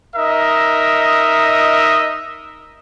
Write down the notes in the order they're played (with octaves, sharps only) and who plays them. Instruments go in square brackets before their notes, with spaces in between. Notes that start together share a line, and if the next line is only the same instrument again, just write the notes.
[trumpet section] D#4 A#4 D#5 E5